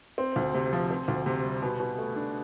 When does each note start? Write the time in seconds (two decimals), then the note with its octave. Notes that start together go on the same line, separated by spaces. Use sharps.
0.18 C4
0.36 D2
0.54 C3
0.73 F3
0.91 C4
1.08 D2
1.26 C3
1.44 G3
1.62 B2
1.80 B2
1.98 A3
2.16 D4